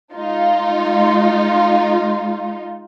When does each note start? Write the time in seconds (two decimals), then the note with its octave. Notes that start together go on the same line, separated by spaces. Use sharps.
0.13 G#3 D#4 F4